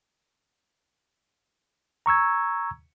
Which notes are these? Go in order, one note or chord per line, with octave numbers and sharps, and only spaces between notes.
A#5 C#6 E6 G#6